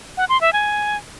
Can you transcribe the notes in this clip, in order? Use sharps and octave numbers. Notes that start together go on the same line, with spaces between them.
F#5
C6
E5
G#5